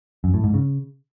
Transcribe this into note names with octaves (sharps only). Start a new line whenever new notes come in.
F#2
A2
G#2
C#3